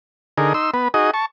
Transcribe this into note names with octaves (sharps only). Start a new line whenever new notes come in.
D3 D#4 G#4 A#4
D#4 C6 E6
B3 B4
D#4 F#4 G#4 D#5
A5 C#6